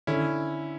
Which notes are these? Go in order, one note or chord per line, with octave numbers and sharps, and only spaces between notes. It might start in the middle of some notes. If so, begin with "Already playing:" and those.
D3 C#4 E4